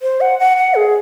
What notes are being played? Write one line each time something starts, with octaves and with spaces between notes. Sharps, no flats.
C5
F#5
F#5
F#5
G#4